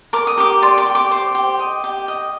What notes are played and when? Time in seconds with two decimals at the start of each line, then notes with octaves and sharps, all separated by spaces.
0.13 A#4 D6
0.27 D#6
0.38 G4 D6
0.62 D5 C6
0.78 D6
0.86 G4
0.95 D6
1.11 C5 D6
1.35 G4
1.59 D#5
1.84 G4
2.08 D#5